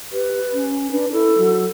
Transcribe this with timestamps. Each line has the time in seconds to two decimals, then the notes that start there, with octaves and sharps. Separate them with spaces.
0.12 G4 B4
0.53 C#4
0.91 D4 B4
1.12 E4 A4
1.38 F#3